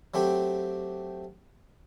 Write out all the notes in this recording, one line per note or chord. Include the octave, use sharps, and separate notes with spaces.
F#3 A3 C4 G4